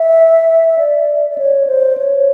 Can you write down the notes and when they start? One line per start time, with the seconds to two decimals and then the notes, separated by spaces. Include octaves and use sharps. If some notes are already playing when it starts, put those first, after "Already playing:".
Already playing: E5
0.79 D5
1.30 D5
1.38 C#5
1.67 C5
1.98 C#5